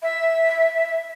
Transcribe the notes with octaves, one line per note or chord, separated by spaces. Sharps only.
E5